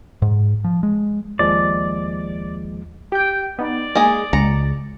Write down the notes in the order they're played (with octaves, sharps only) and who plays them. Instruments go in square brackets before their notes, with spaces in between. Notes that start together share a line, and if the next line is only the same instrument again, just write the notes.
[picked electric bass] G#2
F3
G#3
[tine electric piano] D#2 F3 G#3 [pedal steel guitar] D5
[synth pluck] G4 G6 [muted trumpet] G5
[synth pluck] B3 D#4 [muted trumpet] D5
[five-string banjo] G#3 G#4 [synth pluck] A#3
[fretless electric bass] C#2 [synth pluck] G#3 C#7 [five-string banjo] A#5